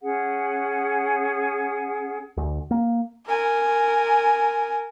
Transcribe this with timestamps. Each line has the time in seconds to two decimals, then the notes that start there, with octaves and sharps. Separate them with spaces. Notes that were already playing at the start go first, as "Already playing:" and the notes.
0.03 C#4 G#4 F#5
2.37 D2
2.71 A#3
3.27 A#4 G#5